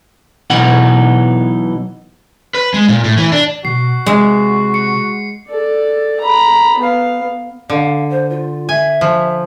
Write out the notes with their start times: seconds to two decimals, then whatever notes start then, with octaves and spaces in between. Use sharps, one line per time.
0.50 B1 B2 E3 D#4 F#5
2.54 B4
2.74 G#3
2.88 A#2
3.04 A2
3.18 E3
3.32 D4
3.65 B2 F#4 C7
4.06 C3 G#3 E5
4.74 C#7
5.50 A4 D5
6.20 A#5 B5
6.79 B3 F5
7.70 D3 F5
8.10 C5
8.30 F4
8.69 E5 G#5
9.01 F3